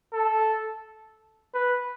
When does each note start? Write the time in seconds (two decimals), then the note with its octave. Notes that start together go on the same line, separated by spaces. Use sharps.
0.13 A4
1.54 B4